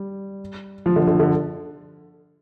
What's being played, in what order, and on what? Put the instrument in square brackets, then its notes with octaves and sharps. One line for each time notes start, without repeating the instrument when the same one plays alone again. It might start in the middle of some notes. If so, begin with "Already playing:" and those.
Already playing: [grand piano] G3
F3
D3
D3
D3